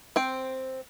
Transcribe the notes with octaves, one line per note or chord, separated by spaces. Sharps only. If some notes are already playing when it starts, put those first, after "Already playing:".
C4 G5